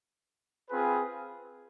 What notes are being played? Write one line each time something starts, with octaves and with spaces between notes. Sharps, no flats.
C4 F4 G#4 B4